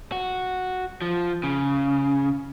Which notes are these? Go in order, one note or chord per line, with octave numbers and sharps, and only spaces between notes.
F#4
F3
C#3